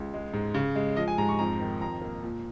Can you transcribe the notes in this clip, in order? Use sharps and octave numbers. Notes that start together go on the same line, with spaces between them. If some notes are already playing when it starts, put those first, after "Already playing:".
Already playing: C#2
G#3
G#2
C#3
G#3
F3 D#5
G#5
G#2 A#5
C#6
F2 A#5
D#3
F2 A#5
A#3
A#2